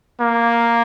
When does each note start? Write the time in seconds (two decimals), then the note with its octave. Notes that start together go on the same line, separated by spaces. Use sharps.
0.20 A#3